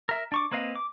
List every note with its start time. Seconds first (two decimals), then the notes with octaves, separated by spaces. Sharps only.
0.09 A#4 E5
0.32 D4 C#6 D6
0.51 A#3 C4 B4 D#5 F5
0.75 D6